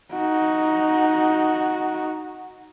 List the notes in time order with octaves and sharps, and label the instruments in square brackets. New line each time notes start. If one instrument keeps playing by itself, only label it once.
[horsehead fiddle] D#4 F#4